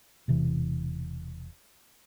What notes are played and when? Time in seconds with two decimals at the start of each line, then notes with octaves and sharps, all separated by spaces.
0.28 E1 C3 E3